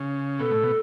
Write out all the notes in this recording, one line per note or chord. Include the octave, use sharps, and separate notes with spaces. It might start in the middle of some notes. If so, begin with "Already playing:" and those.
Already playing: C#3
B2 A4
A2
B2